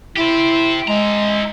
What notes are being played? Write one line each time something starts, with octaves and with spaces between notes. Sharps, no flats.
E4 G4 C5
G#3 E4 A#5